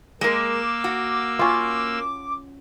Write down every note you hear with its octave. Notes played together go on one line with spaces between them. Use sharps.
G#3 A#3 A#4 D6 E6
F#4
C#4 F4